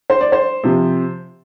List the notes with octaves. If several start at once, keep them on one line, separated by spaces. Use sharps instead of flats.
C5
D5
C5
C3 F3